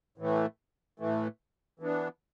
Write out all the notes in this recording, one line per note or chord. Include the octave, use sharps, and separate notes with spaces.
A2 E3 A3
A2 E3 A3
E3 B3 D4